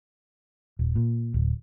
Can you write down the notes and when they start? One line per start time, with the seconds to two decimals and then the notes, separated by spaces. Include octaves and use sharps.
0.79 D#1
0.96 A#2
1.34 D1